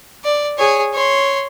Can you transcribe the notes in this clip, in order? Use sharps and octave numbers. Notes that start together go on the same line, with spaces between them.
D5
G#4 C#5
C#5 C6